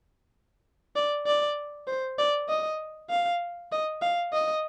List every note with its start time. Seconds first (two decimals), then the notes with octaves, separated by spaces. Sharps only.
0.96 D5
1.27 D5
1.87 C5
2.19 D5
2.49 D#5
3.10 F5
3.72 D#5
4.02 F5
4.33 D#5